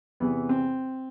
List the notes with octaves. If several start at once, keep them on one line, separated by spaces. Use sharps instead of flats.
E2 C3 E3 B3
C4